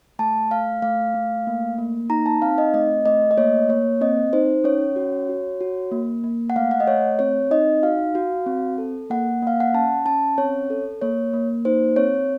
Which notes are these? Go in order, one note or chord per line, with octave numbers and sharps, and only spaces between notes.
A3 A5
A3 F5
A3 F5
A3
A#3
A#3
D#4 A#5
A5
C4 F5
D#5
A3 D#5
A3 D#5
D#5
A#3 C#5
A#3 C#5
C4 D#5
D#4 C5
C#4 C#5
F#4
F#4
F#4
A#3
A#3
F#5
A3 F5
F#5
D#5
A3 C#5
C4 C#5
D#4 D#5
F#4 F5
F#4
C4
A4
A#3 F#5
A#3 F5
F#5
C#4 A5
C#4 A5
C4 C#5
A4
A#3 C#5
A#3
D#4 C5
C4 C#5